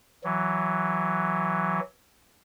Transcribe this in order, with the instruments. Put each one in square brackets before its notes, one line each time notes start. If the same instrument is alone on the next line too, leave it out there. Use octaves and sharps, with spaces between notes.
[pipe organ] E3 F#3